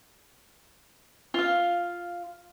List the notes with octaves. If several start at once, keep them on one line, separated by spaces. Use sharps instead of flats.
F4 F5